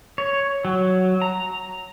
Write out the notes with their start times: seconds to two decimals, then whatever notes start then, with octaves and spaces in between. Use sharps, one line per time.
0.18 C#5
0.65 F#3
1.22 A#5